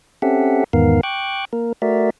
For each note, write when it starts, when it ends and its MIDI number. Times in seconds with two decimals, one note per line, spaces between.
0.22 0.64 60
0.22 0.64 61
0.22 0.64 67
0.22 0.64 69
0.22 0.64 76
0.22 0.64 78
0.73 1.01 40
0.73 1.01 44
0.73 1.01 51
0.73 1.01 59
0.73 1.01 70
0.73 1.01 77
1.03 1.45 79
1.03 1.45 85
1.03 1.45 86
1.03 1.45 90
1.53 1.73 58
1.53 1.73 70
1.82 2.10 57
1.82 2.10 66
1.82 2.10 70
1.82 2.10 74
1.82 2.10 76